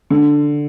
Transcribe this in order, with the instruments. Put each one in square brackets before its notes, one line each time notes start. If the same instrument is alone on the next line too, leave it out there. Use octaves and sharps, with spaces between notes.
[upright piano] D3